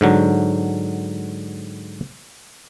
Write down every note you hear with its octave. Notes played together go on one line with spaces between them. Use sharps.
G#2 D3 F#3